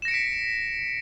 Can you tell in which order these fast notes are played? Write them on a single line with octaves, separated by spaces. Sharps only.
E7 A#6 C#7 D7 B6